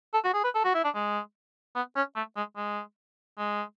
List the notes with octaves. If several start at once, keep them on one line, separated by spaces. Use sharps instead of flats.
A4
F#4
G#4
B4
A4
F#4
E4
D4
G#3
B3
C#4
A3
G#3
G#3
G#3